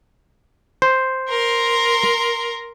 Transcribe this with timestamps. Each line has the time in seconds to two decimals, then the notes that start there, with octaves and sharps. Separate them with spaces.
0.82 C5
1.30 A#4 C6